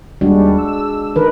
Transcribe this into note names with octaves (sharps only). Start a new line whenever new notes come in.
D#2 G3 G#3 D4 F#4
E6
D#3 D#4 A#4 B4